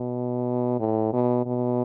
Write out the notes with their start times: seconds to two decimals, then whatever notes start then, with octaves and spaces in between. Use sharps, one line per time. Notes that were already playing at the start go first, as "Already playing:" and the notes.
Already playing: B2
0.80 A2
1.13 B2
1.46 B2